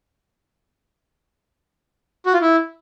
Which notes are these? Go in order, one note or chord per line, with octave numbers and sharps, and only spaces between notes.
F#4
F4
E4